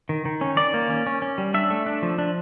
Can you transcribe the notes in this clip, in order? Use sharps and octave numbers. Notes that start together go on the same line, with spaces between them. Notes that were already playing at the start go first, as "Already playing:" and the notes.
D#3
D#3
C#4
D#3 D5
A#3
C#4
C#4
C#4
G3
D4 E5
A3
D4
F3
D4